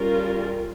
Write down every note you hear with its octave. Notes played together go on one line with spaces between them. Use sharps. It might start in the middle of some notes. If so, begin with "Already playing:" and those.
Already playing: G3 C#4 F4 A#4